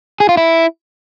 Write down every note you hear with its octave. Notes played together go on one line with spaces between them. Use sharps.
G#4
F4
E4